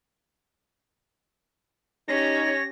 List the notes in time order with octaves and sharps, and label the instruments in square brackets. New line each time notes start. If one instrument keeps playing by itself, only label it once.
[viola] C#4 G4 [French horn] D#4 [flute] C#5 [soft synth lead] A#6